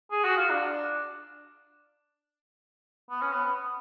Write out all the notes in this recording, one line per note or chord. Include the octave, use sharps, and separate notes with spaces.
G#4
F#4
F4
D4
B3
C#4
B3